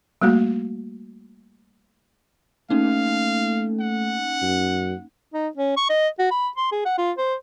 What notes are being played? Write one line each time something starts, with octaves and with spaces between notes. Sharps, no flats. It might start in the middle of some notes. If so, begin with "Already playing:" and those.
G3 A3 A#3 F#4
A3 A#3 C#4 D#4 F5
F#5
F#2
D#4
C#4
C#6
D#5
F#4
B5
C6
G#4
F#5
F4
C5